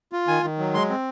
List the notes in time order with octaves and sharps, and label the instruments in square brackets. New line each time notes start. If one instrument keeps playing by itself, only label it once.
[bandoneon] F4
D#3 G#5
D#3
F#3
G#3 C6
C4